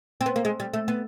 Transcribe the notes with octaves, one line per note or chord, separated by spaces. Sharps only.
C4
B3
A#3
G#3
G3
A3
B3